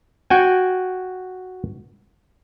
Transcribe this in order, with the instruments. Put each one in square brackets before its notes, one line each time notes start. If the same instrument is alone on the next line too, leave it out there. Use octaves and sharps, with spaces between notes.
[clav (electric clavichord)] F#4 G5 G#5